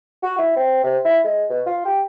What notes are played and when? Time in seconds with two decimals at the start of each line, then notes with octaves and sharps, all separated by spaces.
0.23 F#4
0.38 E4
0.56 C4
0.83 C3
1.05 E4
1.24 G#3
1.50 B2
1.66 F4
1.85 G4